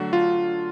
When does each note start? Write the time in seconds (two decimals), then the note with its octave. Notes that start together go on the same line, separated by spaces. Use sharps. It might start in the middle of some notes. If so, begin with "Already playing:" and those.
Already playing: D3 F#3 A3 D4 F#4
0.13 F4